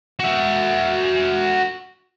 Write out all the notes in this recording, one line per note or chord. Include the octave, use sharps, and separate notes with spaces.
F#4 E5